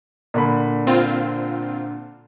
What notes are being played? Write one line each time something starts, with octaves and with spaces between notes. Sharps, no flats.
A#2 D3 B5
C4 F4